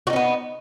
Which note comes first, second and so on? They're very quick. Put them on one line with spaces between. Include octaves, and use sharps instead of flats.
F#4 D#4 C#4 B3